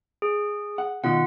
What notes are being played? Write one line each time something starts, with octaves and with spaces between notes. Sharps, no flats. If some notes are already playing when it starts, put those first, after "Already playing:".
G#4
F#5
B2 D#3 F4 F#5